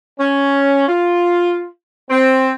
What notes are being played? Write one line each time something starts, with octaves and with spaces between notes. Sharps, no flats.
C#4
F4
C4